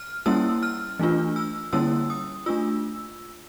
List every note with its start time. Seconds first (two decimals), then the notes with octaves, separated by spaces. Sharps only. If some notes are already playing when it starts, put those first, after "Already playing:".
Already playing: F6
0.26 G3 A#3 C#4 E4 E6
0.63 F6
0.99 E3 A3 D4 F4
1.36 E6
1.73 D3 G3 A#3 C#4 E4 E6
2.10 D#6
2.46 A3 D4 F4 E6